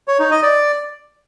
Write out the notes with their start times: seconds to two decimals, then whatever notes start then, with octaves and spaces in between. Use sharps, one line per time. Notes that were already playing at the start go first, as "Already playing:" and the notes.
0.08 C#5
0.19 D#4
0.31 D#5
0.43 D5